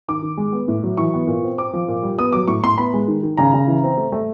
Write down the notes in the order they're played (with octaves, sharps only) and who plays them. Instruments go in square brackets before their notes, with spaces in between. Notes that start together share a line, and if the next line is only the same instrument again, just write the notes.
[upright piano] D#3 D6
D#3
G#3
B3
A2
F#3
E3 C#6
B3
A#2
C4
C4 D6
F3
A#2
G3
B3 D#6
F#3 D6
A2 C#6
A2 C6
B3 B5
G#3
D#3
D#3
C#3 A#5
C#3
E3
C4
A3
A3